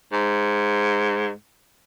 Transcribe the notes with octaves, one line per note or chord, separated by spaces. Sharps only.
G#2